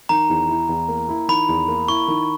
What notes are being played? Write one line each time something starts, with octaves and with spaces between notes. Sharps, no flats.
D#3 A#5
E2
E4
E2
A#3
E4
D#3 B5
E2
A#3
E4 C#6
D#3